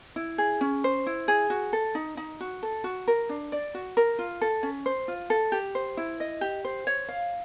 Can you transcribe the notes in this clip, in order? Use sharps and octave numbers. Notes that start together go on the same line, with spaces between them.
E4
G#4
C#4
C5
E4
G#4
F#4
A4
D#4
D#4
F#4
A4
F#4
A#4
D4
D5
F#4
A#4
F4
A4
C#4
C5
F4
A4
G4
C5
E4
D#5
G4
C5
C#5
F5